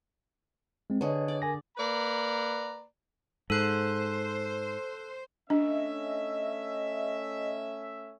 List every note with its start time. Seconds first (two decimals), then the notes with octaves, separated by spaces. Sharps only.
0.90 G#3 C4
1.01 D3 G#4 B4 C#5 D#5
1.28 D5
1.42 A#4 G#5 A#6
1.77 A#3 B4 D5 A#5 B5
3.50 G#2 A4 C5 F#6
5.50 A3 C#4 D4 D#5 E5